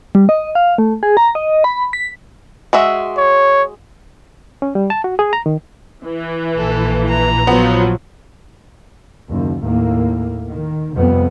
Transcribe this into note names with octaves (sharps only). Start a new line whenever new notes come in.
G3
D#5
F5
A3
G#4
A#5
D#5
B5
B6
G#3 F#4 E5
C#5
C#4
G3
A5
F#4
G#4
A#5
D#3
E3
A#1 A#2 A4
A#5
F3 F#3 B3
F#1 D#2
D#2 A2 A#3
D#3
F2 C3 G3 B3